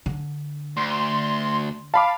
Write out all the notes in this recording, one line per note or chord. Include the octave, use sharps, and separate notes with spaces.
D3
D2 C6
F5 A5 B5 D6